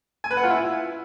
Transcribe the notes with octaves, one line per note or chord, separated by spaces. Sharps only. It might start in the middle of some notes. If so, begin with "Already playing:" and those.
G#5
B4
F#5
F4
E4